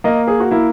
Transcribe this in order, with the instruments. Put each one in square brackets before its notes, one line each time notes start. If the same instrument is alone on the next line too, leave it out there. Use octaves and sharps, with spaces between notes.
[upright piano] A#3 D#5
G#4
F#4
A#3 E4